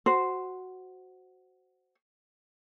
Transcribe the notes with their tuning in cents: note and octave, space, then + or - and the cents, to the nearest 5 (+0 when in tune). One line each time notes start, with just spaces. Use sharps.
F#4 +0 C5 +0